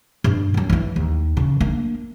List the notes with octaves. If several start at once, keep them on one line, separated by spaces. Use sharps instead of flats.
G2
F#2 F#3
E3 E4
D#2
C#3
A#3 D4